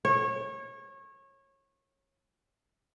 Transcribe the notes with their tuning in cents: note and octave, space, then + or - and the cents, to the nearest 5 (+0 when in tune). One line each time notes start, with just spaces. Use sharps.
C#5 -25